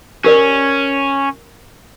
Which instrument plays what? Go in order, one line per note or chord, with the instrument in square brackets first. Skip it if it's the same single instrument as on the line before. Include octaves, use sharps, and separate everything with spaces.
[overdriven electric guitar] C#4 [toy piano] G4 A#4 D5